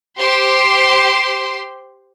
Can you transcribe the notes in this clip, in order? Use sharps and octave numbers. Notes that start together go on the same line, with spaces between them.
G4 C5 C6